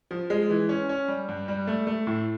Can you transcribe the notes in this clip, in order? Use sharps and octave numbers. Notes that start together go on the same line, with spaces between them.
F3
G#3
E3
C#4
C#4
G3
G2
G3
A3
A3
A2